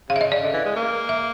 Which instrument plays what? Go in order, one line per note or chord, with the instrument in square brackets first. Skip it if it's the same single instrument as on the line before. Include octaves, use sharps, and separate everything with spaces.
[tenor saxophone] C#3 [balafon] F5
[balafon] E5
D#5
D5
[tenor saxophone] D3
E3
G#3
A#3
[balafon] E5